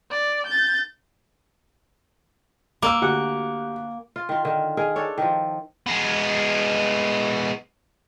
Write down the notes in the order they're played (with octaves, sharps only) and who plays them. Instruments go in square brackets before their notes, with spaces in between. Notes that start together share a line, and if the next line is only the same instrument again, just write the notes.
[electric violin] D5
G6 A6
[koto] A#3 [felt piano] D6 E6
[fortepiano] D2 F#4 F#5 [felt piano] G4
[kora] F4
D#3 F4
D3 D#3
D#4 G#4 A#4
D4 A4 C#5
D#3 F3
[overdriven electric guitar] G#3 B3